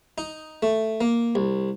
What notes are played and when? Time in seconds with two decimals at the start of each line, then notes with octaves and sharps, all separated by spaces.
0.18 D#4
0.63 A3
1.01 A#3
1.35 C2